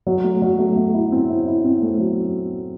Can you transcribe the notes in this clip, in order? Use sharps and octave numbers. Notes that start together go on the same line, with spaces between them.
F#3
A3
F#3
A3
A3
E4
C4
E4
E4
C4
A3
F#3